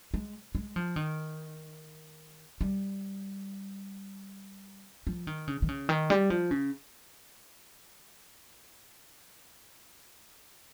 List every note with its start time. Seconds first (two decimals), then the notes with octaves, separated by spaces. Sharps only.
0.14 G#3
0.55 G#3
0.76 F3
0.96 D#3
2.61 G3
5.07 F3
5.27 D#3
5.48 C#3
5.62 D#3
5.68 C#3
5.89 D#3
6.10 G3
6.30 F3
6.51 C#3